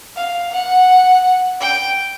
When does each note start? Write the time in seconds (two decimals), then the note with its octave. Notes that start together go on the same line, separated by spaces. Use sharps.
0.16 F5
0.52 F#5
1.60 G5